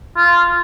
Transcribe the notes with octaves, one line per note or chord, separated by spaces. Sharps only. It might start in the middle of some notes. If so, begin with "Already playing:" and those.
F4